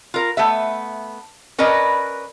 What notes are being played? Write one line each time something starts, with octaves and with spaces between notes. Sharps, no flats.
F4 A#4
A3 B3 E5
C#4 A#4 B4 D5 D#5